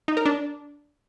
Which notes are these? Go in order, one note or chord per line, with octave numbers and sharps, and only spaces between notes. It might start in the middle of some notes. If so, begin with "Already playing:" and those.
D#4
A#4
D4